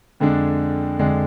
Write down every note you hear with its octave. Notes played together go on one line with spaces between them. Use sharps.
F2 D3 G#3 D4
F2 D3 G#3 D4